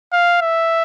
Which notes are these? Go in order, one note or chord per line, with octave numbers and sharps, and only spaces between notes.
F5
E5